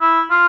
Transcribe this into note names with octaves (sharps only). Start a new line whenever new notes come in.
E4
F4